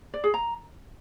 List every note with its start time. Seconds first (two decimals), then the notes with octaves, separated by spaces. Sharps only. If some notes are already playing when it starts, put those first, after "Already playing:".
0.14 D5
0.24 G#4
0.34 A#5